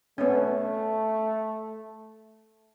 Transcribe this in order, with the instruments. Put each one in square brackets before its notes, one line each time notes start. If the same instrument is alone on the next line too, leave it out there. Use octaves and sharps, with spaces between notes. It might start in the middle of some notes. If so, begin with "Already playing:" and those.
[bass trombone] A3 [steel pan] B3 C#4